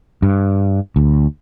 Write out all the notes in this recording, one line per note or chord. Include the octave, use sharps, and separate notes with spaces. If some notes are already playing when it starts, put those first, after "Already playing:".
G2
D2